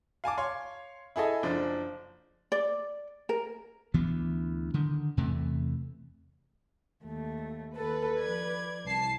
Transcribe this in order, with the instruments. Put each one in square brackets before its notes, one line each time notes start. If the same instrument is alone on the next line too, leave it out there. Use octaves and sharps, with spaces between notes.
[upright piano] F5 G#5 A5 D6
C#5 F5 C6
E4 G#4 A4 D#5
F#1 F3 D4
[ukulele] D5
A#4
[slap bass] D2 E3 B3
D3 D#3
E2 C3 E3 A3
[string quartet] D#2 A3
[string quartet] D#2 A4 [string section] B4
[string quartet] F3 D5 G#6
[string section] C2 A5 C7